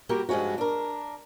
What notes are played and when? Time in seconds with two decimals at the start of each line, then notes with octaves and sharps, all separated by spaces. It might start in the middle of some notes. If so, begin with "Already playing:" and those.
0.09 G3 A#3 F#4 G4 A#4
0.29 G2 F3 G#3 C#4 F#4
0.58 D4 A#4